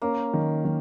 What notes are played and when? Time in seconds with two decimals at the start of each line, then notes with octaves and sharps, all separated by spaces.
0.02 A#3 C#4
0.33 D#3
0.65 D#3